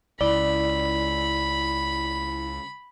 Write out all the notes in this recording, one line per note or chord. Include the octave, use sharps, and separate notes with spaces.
C#2 E4 D5 B5